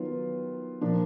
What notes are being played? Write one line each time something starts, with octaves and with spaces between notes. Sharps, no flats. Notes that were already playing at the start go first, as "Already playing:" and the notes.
Already playing: D#3 F#3 B3 F4
A#2 F3 A#3 D4